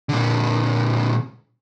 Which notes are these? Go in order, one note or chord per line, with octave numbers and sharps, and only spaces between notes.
A#2 D3